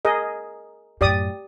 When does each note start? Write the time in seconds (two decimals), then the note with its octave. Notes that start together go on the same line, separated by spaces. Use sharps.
0.05 G#4 A#4 D#5
1.01 F#2 A2 G4 D5 D#6